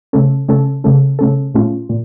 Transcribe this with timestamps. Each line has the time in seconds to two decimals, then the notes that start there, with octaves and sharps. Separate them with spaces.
0.13 C#3 A3 C#4 A4
0.48 C#3 A3 C#4 A4
0.84 C#3 A3 C#4 A4
1.19 C#3 A3 C#4 A4
1.54 A#2 A3 C#4 F4
1.89 A#2